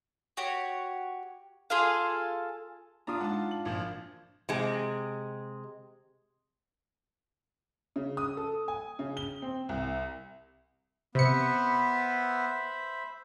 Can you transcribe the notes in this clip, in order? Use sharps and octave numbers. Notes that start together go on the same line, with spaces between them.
F#4 G4 C#5
F4 G#4 A4 F5
D4 D#4 F4 A#5 D#6
G#3 D#4 F#5 A5
F#7
G#1 A#2 F3
C3 G#3
C#3
D#6
A4
G#5
C#3
G7
C4
C2
C3 B3 C5 E5 B5 C#7